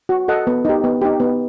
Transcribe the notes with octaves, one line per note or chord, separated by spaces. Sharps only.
F#4
A4 D#5 F#5
B3
D#4 G4
B3
D#4 G4
B3